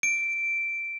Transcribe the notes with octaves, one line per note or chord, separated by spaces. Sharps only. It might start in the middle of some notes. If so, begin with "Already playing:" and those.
D7